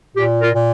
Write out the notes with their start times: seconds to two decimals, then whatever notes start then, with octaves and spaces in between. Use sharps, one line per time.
0.15 A#2 G4
0.41 F4 A#4
0.54 A#2